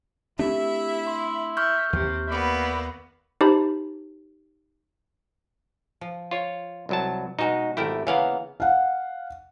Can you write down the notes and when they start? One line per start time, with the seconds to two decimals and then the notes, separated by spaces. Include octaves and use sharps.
0.39 A3 C4 D4 E4 G4 E5
1.07 C6
1.57 E5 C#6 F6 G6
1.93 D#2 C3
2.28 A#3 B3 D5 E5 B5
3.41 D#4 G4 C5 A5 B5
6.01 F3
6.31 F4 C#5
6.89 C2 F#3 A5
7.39 B2 G#3 D#4 F#4
7.77 G#1 A3 E4 G4 A#4 G5
8.07 C#3 E3 A#3 B3 F5 F#5
8.60 F5 F#5